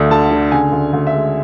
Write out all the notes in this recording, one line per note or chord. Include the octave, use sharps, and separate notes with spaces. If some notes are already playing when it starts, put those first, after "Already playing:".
Already playing: D2 A3
D3 A5
D3
C#3 G#5
D2
D2
E5
G#3